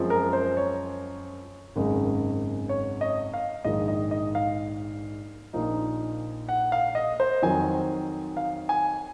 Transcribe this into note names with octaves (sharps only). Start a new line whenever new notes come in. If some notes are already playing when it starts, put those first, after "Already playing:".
Already playing: F#2 F3 G#3 C4
A#4
C5
C#5
G#1 F#2 C#3 G#3
C#5
D#5
F5
A#1 G#2 D#3 D#5
D#5
D#5
F5
A#1 A#2 F3 A#3 D#4
F#5
F5
D#5
C5
F2 D#3 F#3 C4 G#5
F5
G#5